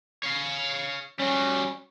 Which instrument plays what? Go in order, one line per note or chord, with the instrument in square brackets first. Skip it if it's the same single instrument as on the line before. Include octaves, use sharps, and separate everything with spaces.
[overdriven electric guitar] C#5 F5
[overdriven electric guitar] G3 F#4 [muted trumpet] C#4